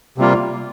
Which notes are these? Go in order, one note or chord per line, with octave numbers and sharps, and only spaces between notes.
C3 G3 A#3 F4